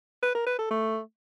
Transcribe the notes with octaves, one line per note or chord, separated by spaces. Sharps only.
B4
A#4
B4
A4
A3